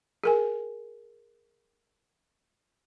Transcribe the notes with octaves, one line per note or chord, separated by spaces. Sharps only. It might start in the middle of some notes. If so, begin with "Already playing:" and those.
G#4 A#4 G#5